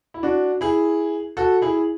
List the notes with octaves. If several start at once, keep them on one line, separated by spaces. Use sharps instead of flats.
E4
D4 F#4
E4 G#4
F#4 A4
E4 G#4